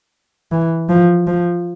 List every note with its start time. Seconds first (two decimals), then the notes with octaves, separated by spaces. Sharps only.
0.52 E3
0.89 F3
1.27 F3